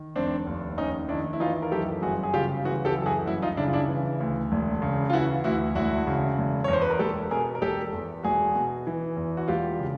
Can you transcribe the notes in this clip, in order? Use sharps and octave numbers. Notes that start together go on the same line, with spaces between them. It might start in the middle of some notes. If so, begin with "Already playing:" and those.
Already playing: D#3
F1 C4 D4
D#2
F1 C#4 D#4
D#3 D4 E4
E4
E3 D#4 F4
A#4
F#2 G4 A4
G1 F#4 G#4
G#4
C#3 F4 G4
E3 F#4 G#4
G4 A4
F#2
A4
F#4 G#4
G1 E4 F#4
D#4 F4
C#3 D4 E4
F4
D4 E4
E3
D2
E1
C#3
F4
E3 E4 F#4
D2 E4 F#4
E1 E4 F#4
C#3
E1
E2 C#5
C5
B4
A#4
E1 G4 A4
B2 G#4 A#4
A#4
E1 G4 A4
E2
E1 F#4 G#4
B2
E3
E2
F#4
E1 F4 G4
C#3